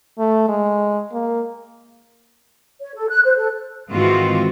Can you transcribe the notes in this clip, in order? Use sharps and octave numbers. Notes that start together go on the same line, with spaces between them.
A3
G#3
A#3
C#5
A4
F#6
C5
A4
G#2 D#3 E3 C4 F4 F#4